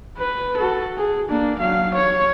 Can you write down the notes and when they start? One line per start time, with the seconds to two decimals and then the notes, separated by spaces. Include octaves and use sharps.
0.18 B4
0.57 F#4 A4
0.97 G#4
1.29 A#3 D4
1.59 F#3 F5
1.94 C#5